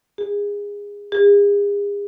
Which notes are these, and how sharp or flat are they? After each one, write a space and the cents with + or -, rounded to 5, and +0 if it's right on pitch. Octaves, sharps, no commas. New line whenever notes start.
G#4 -25
G#4 -40